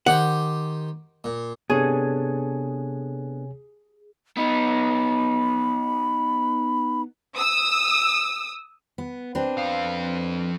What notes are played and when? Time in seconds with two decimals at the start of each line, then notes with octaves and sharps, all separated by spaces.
0.06 D#3 G4 C5 F#5
1.24 A#2
1.70 C3 B3 D4 G#4 A4 C#5 G#5
4.37 B3 D#4 B5
7.36 D#6 E6
8.98 B3
9.35 C4 D4 B4
9.58 F2 F5